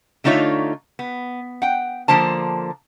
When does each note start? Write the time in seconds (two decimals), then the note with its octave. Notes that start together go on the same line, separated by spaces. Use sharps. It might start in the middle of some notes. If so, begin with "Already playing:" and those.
0.24 D3 A3 D#4 F4 C#5 E5
0.99 B3
1.62 F#5 G5
2.08 D3 F3 A#3 C5 A5